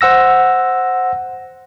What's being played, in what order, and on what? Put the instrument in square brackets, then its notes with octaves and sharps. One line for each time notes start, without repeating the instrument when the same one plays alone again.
[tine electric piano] C5 F#5 E6 A#6